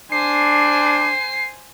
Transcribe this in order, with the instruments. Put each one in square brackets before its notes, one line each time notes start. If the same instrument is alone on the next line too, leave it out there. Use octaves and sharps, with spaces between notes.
[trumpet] D4 [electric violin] C5 G#5 [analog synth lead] C7